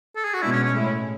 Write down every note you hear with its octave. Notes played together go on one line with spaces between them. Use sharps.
A4
G#4
F#4
B2 G#3 D4 E4
C#4
C#4
A2 G#3 C#4 E4